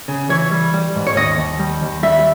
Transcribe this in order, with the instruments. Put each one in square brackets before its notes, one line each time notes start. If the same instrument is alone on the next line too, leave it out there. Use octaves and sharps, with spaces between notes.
[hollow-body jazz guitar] C#3
E3 C#5
G3
G3
G#2
C#5
D#2 D#5
D#2
G3
D#2
G3 E5